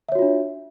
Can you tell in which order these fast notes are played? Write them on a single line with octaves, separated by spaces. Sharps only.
E5 C#5 F#4 F4 D4